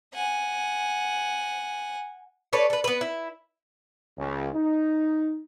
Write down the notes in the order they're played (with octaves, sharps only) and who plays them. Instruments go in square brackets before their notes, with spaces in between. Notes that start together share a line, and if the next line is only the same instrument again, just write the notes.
[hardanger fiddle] F#5 G#5
[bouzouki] A4 B4 C#5 D5
A4 B4
B3 B4
E4
[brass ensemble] C#2
D#4